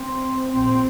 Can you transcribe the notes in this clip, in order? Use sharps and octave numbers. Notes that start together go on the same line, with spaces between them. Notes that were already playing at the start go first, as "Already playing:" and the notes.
Already playing: C4
A#1 A#2 C4